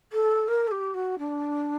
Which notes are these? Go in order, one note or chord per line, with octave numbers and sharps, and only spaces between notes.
A4
A#4
A4
G4
F#4
D4